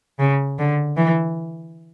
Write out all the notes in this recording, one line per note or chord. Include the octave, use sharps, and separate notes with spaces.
C#3
D3
E3